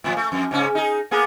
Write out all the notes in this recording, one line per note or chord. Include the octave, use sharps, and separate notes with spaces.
A2 D3 F3
A3
F2
G#2 C#3 C#4
D#4 G#4
A#3 B3 G#4